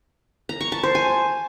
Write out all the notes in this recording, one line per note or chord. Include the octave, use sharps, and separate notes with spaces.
A#5
C#6
A5
C5
G#5